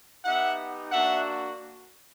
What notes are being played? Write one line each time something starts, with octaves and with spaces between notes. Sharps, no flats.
B3 D#4 G4 E5 F#5
A#3 D4 F#4 E5 F#5